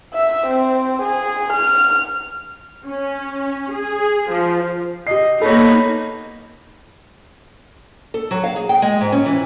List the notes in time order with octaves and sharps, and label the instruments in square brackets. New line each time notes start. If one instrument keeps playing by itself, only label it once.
[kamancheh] E5
C4
G#4
F6
[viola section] C#4
G#4
F3
[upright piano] G4 C7 [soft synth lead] D#5
[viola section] A#3 B3 D#4 [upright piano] A4 C#5 [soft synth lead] B5
[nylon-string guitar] A4
F#3
F5
G#4
G5
G#3
G#2
C#4
E3